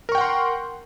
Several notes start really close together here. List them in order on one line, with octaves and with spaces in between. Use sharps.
A#4 C#6 G5 F#5 C6